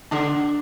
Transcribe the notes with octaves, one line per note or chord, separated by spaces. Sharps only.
D3 D4